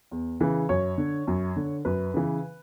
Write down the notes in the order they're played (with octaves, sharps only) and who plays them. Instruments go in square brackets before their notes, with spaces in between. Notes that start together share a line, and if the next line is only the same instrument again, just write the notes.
[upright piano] E2
C#3 E3
F#2 C#5
D3
F#2
D3
F#2 B4
C#3 E3